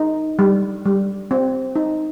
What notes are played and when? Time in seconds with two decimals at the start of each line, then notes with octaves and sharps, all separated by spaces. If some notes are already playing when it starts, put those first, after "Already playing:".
Already playing: D#4
0.39 G3
0.86 G3
1.31 C4
1.76 D#4